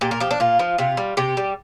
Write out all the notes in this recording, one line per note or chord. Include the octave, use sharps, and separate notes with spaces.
A#2 G4
A#4
F3 G4
D4
A#2 F4
F3
C3 F4
G3
C3 G4
G3